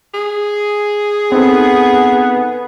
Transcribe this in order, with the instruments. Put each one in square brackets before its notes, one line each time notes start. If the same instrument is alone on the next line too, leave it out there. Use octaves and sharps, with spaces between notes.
[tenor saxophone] G#4
[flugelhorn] B3 [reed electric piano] C4 D#4 A4